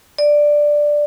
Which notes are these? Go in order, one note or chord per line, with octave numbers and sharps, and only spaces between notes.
D5